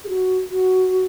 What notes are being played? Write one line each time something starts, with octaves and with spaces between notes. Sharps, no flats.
G#4
F#4
F#4